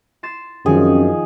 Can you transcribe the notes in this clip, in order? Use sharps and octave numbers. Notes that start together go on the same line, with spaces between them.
C6 A6 E7
F#2 D#3 F3 C4 C#4 D#4 G#4